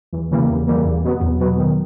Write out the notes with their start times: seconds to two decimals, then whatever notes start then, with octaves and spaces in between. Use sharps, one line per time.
0.13 E2
0.31 C#3 E3 G3 A#3
0.49 E2
0.67 C#3 E3 G3 A#3
0.85 E2
1.04 B2 F#3 B3
1.21 E2
1.40 B2 F#3 B3
1.59 D#3